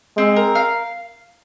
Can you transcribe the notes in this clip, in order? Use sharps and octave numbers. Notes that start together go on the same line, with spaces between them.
G#3 C4
A#4
F5